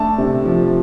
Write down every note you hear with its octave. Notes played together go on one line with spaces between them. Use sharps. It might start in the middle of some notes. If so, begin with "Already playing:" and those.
Already playing: A3 D4 A5
C3
F3